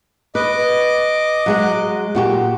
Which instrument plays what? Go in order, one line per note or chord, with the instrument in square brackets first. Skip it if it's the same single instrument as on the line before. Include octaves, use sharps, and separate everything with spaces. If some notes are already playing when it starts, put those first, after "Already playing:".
[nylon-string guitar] B4 [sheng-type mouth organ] D#5 D6
[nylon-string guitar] F#3 G#3 F#5
A#2 F#4 G4